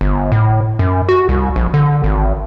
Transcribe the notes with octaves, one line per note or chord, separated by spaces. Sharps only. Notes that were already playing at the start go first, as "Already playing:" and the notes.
G1
A2
F#2
F#4
C2
A#1
D3
G#1